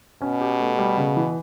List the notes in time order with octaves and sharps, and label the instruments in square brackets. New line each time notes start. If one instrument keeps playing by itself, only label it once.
[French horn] B2 [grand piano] C#4
[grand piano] G4
A3
G3
C#3
E3